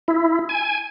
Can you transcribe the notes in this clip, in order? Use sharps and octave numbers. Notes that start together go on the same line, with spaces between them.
E4
G#5